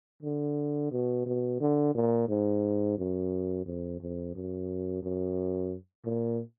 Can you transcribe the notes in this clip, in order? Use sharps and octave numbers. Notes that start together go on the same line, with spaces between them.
D3
B2
B2
D3
A#2
G#2
F#2
F2
F2
F#2
F#2
A#2